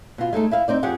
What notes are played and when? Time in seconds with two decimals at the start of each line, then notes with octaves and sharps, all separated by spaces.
0.18 B2 F4
0.33 G#3 A3 D#4 A4
0.51 E4 E5 F5
0.68 C4 D#4 D5
0.83 F2 G4 G#4 F#5